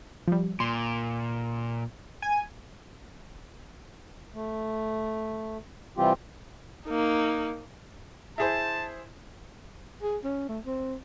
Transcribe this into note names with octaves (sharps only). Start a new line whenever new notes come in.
F3 G3
A#2 C6
G#5
A3
C3 E3 G3 C4 F4 G4
A#3 D#4
E4 G#4 C5 A5
G#4
C#4
A3
C4